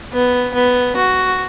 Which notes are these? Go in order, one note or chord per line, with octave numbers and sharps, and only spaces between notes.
B3
B3
F#4